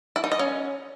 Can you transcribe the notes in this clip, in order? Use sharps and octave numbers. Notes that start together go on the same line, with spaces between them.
E4
D#4
D#5
C#4